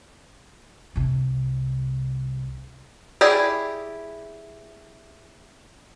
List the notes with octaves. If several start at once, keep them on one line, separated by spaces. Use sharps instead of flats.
C2 C3
E4 G4 G#4 D5